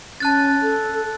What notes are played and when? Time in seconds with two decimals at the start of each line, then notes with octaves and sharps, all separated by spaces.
0.20 C#4 A5 F#6 A6
0.62 A4